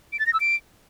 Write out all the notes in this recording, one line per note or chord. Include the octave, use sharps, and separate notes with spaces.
D7
A6
A#6
E6
D7